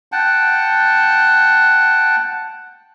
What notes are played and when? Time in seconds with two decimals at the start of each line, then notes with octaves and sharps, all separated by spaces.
0.12 F#5 G5 A5